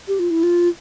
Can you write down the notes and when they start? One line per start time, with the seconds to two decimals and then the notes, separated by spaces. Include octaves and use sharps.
0.08 G4
0.19 F4
0.31 E4
0.43 F4